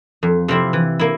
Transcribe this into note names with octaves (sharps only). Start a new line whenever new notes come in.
F2
C3 F3 C4 E4
E3
A#3 E4